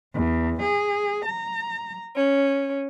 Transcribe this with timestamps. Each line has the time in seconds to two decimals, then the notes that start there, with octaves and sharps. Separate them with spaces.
0.14 E2
0.62 G#4
1.26 A#5
2.15 C#4